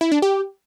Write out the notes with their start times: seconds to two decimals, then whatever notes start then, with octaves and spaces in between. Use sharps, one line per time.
0.01 E4
0.12 D4
0.22 G4